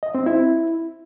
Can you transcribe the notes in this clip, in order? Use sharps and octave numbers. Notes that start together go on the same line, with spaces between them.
D#5
C4
E4